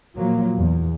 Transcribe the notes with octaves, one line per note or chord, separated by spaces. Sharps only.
A#2 F3 F#3 A#3
E2